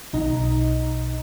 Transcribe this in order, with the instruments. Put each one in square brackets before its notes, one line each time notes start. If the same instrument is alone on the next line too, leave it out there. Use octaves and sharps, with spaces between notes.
[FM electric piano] B1 B2 D#4 D#5 A#5